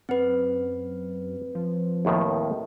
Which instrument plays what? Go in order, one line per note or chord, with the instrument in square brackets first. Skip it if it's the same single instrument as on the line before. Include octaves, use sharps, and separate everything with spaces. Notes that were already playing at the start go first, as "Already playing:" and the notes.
[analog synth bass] F#2 [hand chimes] C4 B4 [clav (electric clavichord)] F#5
[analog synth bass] F3
[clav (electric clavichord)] D#2 A2 D#3